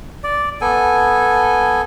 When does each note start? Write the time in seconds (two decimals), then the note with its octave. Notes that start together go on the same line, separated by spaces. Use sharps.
0.24 D5
0.61 B3 A4 G#5